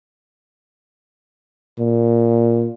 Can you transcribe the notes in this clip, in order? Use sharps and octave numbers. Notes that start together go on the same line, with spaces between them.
A#2